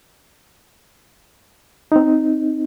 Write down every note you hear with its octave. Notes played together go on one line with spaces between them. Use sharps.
C4 D#4